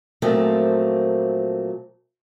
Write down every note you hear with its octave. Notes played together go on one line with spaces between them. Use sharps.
A#2 F3 F#3 A3 A#3 C4